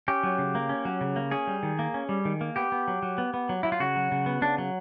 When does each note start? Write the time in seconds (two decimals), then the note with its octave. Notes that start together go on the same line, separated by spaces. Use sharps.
0.08 C#4 G4
0.23 F#3
0.39 C#3
0.55 A#3
0.69 C#4
0.85 F#3
1.01 C#3
1.16 A#3
1.31 C#4 G#4
1.47 G3
1.63 D#3
1.79 A#3
1.94 C#4
2.09 G3
2.25 D#3
2.41 A#3
2.56 B3 G4
2.72 B3
2.88 F#3
3.03 F#3
3.18 B3
3.34 B3
3.49 F#3
3.63 F#3 E4
3.72 F4
3.80 C#3 F#4
3.96 F#3
4.12 C#3
4.26 B3
4.42 C#3 D4
4.58 F#3